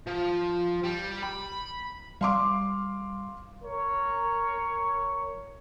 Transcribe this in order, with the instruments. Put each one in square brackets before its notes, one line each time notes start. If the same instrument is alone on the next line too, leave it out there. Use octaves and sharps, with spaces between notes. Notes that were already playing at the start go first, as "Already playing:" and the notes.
[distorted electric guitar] F3
G3
B5
[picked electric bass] G3 [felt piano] F5 C6 D6
[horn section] A#4 C#5